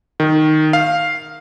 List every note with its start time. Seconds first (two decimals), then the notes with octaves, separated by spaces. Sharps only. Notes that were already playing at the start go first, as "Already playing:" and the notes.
0.20 D#3
0.73 F5